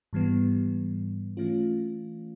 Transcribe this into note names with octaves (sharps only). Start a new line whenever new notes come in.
G#2 E3 G3 B3
E3 A3 C#4 F4